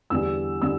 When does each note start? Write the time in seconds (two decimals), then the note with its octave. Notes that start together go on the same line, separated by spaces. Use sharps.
0.10 E2 D3 G3 E6
0.62 D3 G3 E6